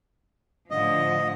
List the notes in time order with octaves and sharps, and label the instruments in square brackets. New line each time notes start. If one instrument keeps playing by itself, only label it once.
[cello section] A2 D3 F3 [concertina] D#5